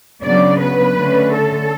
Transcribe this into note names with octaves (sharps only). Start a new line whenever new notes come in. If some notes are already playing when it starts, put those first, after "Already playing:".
C#3 F#3 B3 D4 D5
B4
D3 A3 C#4
A4